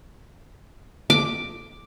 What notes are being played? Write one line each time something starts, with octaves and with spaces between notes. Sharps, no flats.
D6